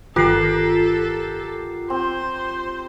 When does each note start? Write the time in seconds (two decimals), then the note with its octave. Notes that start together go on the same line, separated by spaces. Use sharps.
0.16 G1 D#3 F4 G4 A4 A#4 F#5 C7
1.90 C4 C5